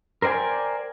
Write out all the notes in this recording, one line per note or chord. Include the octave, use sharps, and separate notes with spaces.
A#4 C5 D5 G5 G#5